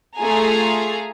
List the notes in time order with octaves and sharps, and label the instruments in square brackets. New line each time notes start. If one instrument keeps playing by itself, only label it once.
[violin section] A3 F4 G#4 G#5 A#5